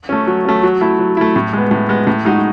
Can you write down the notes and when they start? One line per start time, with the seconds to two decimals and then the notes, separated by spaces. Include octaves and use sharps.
0.09 A3 C#4
0.27 F#3
0.45 A3 C#4
0.63 F#3
0.81 A3 E4
0.99 F#3
1.17 A3 E4
1.36 A2
1.53 G#3 B3
1.71 A2
1.89 G#3 B3
2.07 A2
2.25 G#3 D#4 F#4